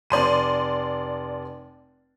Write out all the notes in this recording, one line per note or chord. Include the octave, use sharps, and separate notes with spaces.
F1 D5 C6 D#7